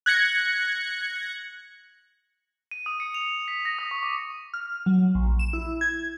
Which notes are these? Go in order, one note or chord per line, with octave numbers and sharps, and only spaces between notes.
F#6 G#6 A#6 C#7
D#7
D#6
C#7
F7
C#7
B6
A#6
D#6
C#6
D6
F6
F#3
A#1
E7
E4
G#6